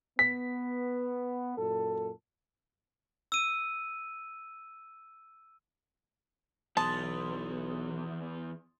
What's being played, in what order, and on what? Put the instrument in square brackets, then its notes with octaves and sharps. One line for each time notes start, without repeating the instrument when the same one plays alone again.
[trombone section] B3 [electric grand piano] B6
[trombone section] F#2 A#2 A4
[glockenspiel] E6 D#7
[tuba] B1 [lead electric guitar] E2 B3 [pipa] A5 [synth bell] C6 D#6 A6